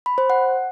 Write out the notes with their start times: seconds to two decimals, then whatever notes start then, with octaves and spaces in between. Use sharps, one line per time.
0.06 B5
0.18 C5
0.30 F#5